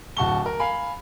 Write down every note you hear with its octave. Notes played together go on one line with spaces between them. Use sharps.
D1 F#4 A5 C#6 G7
A#4
F5 G#5 B5